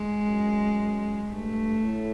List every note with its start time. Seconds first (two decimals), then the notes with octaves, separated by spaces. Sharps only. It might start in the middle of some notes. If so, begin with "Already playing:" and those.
Already playing: G#3
0.27 F#2
1.31 G2 A3
1.83 A2